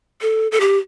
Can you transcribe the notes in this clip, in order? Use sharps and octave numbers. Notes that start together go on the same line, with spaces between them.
A4
A4
G4